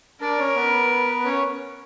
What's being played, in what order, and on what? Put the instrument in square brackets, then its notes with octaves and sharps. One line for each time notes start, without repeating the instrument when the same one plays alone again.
[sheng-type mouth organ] D4 D5 [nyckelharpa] A#4
[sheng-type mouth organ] C#4 C#5
B3 B4
C#4 C#5